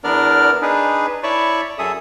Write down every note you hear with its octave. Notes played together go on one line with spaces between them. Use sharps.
E2 B3 D4 A#4 D5 F6
D4 D#4 G#4 B4
E4 C#5 D5 A5 B5 C#6
F#2 G#4 A4 E5 D#6